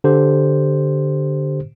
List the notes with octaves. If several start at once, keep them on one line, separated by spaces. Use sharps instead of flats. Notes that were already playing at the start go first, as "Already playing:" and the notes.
D3 G4 C5